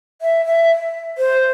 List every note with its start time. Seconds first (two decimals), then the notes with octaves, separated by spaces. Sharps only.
0.22 E5
0.46 E5
1.18 C5